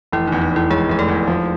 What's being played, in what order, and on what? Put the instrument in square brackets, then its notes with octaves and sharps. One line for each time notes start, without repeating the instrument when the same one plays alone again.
[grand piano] F1 [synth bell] E3 E4
[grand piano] E2 [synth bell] D#4
[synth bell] D#4
[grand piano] E2 [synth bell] E3 E4
[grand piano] F1 [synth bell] G#3 G#4
[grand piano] F1 [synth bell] G#4
[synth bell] A3 A4
[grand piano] E2
F3